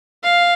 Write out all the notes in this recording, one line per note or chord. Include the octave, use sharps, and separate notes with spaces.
F5